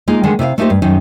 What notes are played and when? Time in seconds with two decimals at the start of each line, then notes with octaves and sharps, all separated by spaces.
0.08 G#3 A#3 D#4 F4
0.23 D3 D#3 G#3 A3 C5 F#5
0.39 C3 E4 D5 F5
0.58 A3 A#3 D#4 F4 G4 C5
0.70 G2
0.82 F#2 D#3 D#4